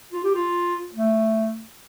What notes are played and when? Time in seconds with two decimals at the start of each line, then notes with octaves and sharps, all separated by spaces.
0.13 F4
0.25 G4
0.35 F4
0.95 A3